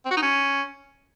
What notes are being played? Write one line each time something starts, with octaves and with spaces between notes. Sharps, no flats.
C4
F#4
D#4
C#4